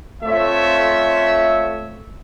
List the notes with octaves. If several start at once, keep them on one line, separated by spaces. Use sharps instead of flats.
A3 C4 F4 C#5 E5